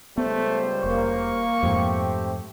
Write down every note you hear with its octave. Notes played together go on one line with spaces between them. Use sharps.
C#2 G3 A3 B3 C5
F1 A#3 C#6
F2 G#2 A3 C4 G4